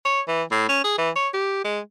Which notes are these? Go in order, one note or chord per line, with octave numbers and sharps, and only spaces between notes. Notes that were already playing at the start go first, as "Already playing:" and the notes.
C#5
E3
A2
C#4
G#4
E3
C#5
G4
G#3